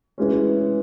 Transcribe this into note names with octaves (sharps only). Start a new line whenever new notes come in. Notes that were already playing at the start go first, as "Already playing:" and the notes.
E3 G#3 C#4